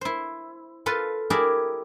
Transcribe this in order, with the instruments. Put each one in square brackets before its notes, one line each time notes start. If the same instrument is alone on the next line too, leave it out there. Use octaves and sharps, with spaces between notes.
[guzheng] E4 C5
F4 A4 B4 C6
E4 G4 G#4 A#4 D5 E5